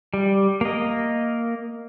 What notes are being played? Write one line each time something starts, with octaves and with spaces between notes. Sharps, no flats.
G3
A#3 D#5